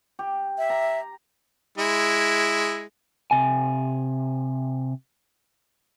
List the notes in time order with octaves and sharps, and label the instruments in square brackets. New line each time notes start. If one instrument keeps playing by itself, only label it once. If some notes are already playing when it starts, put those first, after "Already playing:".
[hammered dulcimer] G4
[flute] E5
[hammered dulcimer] A#5
[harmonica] G#3 E4
[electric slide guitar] C3 G#5